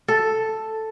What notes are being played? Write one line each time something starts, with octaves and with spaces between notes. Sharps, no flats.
A4